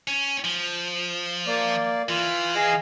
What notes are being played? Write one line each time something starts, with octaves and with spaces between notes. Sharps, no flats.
C#4
F3
A#3 D5
E3 F4
G#4 D#5 F5